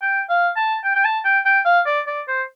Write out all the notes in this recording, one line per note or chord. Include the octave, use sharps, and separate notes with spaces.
G5
F5
A5
G5
G5
A5
G5
G5
F5
D5
D5
C5